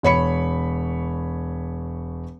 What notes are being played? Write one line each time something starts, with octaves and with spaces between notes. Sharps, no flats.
E1 C#5 B5 C#7